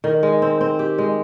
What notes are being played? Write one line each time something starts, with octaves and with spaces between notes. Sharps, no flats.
D#3
G#3
C4
C4
G4
G#3